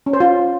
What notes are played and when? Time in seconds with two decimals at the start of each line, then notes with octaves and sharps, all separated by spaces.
0.06 C#4
0.13 C5
0.20 F4